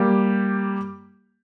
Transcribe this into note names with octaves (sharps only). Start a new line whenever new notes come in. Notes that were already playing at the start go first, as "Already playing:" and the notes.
Already playing: G3 A#3 G4